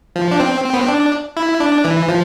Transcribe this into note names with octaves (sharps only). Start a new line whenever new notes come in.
F3
D4
C4
C4
B3
C4
D4
E4
D4
E3
F3